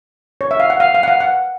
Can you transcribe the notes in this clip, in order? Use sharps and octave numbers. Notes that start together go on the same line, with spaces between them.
C#5
E5
F5
F#5
F5
F5
F#5
F5
F#5